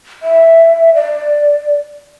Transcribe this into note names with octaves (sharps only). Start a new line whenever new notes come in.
E5
D5